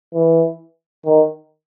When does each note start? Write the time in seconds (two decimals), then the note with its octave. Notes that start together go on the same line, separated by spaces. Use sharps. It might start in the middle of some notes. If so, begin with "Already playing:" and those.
0.14 E3
1.06 D#3